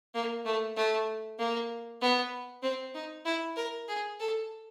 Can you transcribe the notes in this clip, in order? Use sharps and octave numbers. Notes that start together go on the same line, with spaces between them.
A#3
A3
A3
A#3
B3
C4
D#4
E4
A#4
G#4
A4